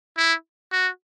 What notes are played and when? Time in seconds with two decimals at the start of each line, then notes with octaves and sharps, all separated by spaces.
0.17 E4
0.72 F#4